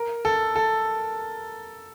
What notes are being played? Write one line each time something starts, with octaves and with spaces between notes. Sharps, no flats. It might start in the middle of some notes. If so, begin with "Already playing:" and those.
Already playing: A#4
A4
A4